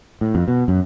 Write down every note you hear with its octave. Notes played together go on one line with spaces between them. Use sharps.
A2
F2
B2
F#2